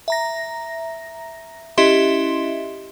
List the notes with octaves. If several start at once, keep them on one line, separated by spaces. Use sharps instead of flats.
E5 A#5 A#6
C#4 E4 G4 D#5 E5 C6